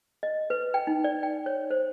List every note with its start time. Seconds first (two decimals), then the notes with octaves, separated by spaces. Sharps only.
0.23 D#5
0.50 B4
0.74 G5
0.87 D#4
1.04 D5
1.23 G5
1.46 C#5
1.70 C5